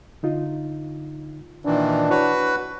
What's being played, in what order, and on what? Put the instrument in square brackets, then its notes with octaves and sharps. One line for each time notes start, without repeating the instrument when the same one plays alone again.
[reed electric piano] D3 D#4 F4
[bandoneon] A#2 D#3 E3 [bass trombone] D4
[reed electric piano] E4 C#5 [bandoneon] F#4 B4